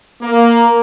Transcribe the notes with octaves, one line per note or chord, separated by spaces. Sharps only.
A#3